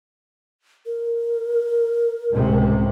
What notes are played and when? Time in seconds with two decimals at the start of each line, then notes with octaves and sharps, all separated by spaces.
0.86 A#4
2.32 C#2 A2 C3